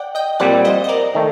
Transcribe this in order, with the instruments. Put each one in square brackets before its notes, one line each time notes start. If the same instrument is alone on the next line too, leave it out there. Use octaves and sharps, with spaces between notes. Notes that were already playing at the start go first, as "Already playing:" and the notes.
Already playing: [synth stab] D5 F#5 G5
D#5 G5
[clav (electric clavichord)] A#2 G3 C4 [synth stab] D5 F#5
[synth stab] C5 D#5
D#5
A#4 D5
[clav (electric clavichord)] D#3 A3